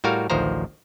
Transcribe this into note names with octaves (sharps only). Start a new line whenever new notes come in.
A2 G3 F#4 A#4 F5
A1 D2 D#3 F3 C5 A#5